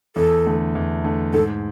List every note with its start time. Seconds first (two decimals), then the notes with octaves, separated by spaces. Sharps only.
0.16 E2 A4
0.46 D3 A3
0.75 E2
1.04 D3 A3
1.33 G#2 A4